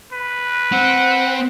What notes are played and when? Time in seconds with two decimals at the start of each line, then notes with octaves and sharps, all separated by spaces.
0.12 B4
0.72 C4 F#5